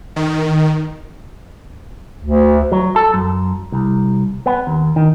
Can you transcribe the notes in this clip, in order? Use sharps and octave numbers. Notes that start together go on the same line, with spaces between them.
D#3
D2
F#3
A4
F#2
C2
B3
D#2
D#3